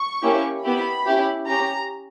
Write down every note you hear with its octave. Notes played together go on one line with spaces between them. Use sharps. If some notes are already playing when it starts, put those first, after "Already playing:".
Already playing: C#6
A#3 C#4 E4 G4
B3 E4 G4 B5
C#4 E4 G4
C#4 G4 A#5